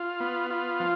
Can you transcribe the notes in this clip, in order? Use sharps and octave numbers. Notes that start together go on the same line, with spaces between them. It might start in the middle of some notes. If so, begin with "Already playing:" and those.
Already playing: F4
B3
F4
F3